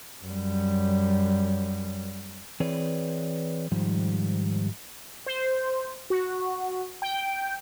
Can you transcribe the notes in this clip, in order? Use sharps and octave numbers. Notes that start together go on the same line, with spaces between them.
F#2 G3
E3 C4 G#4 B4 C#5 D5
G#2 D#3 F3 G3
C5
F#4
G5